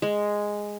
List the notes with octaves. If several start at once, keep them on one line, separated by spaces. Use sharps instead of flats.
G#3